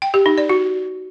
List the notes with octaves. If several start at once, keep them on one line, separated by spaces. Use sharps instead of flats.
G5
G4
D#4
D5
F#4